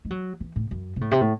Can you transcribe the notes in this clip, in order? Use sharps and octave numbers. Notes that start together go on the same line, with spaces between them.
G#3
F#3
E3
A2
F#2
C3
A2
C3
A2